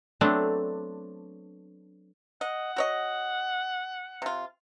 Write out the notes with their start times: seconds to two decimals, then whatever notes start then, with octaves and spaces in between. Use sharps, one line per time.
0.21 F#3 A3 B3 C4 D4
2.41 D#5 F#5
2.76 F#4 C#5 D#5
4.22 C3 F4